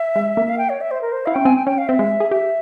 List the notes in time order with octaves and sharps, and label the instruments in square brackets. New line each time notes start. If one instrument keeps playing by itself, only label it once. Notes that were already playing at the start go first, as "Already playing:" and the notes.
Already playing: [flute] E5
[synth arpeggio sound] G#3
A#3
[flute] F5
G5
C#5
E5
C5
A#4
C5
[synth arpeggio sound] E4 [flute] F5
[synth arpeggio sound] C#4 [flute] G5
[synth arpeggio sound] C4 [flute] G#5
[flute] G5
[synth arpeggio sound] C#4 [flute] G5
[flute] F5
[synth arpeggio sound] C4 [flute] E5
[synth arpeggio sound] G#3
G#4
[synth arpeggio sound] G4 [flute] E5